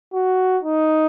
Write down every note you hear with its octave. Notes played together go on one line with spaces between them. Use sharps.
F#4
D#4